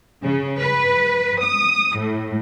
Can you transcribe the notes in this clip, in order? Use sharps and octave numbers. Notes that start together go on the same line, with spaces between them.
C#3
B4
D#6
A2